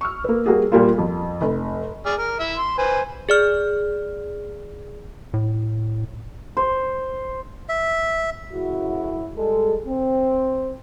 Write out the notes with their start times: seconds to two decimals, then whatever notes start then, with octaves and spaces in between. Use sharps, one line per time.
0.01 C#6 E6 F6
0.24 A#3 B4
0.46 G3 A#3 F#4 G#4
0.72 A#2 G3 A#3 F4
0.98 F2
1.41 F1
2.06 G#4 D5 F6
2.19 A#4 F6
2.40 E4 E5
2.57 C6
2.78 B4 C5 G#5
3.29 G#4 D5 F6
5.34 A2
6.57 C5
7.69 E5
8.51 F#2 A2 C#3 E4 F#4
9.36 G3 G#3 A4
9.87 C4